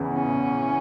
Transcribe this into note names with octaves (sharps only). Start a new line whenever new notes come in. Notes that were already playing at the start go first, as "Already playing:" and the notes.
Already playing: E2 C#3 E3
C#4